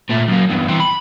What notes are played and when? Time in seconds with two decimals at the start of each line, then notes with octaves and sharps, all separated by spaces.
0.09 A#2 A3
0.28 F#2 A#3
0.49 E2 G2
0.68 E3 C4
0.80 B5